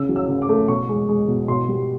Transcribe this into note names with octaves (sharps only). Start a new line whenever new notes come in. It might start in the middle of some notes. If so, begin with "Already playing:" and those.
Already playing: C#3 E6
F#3
E6
C#3
D6
A3
B2 C#6
G#3
G#3
B2
B2 C6
G3